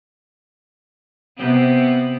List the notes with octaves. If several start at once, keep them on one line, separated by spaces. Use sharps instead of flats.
C3 B3 C4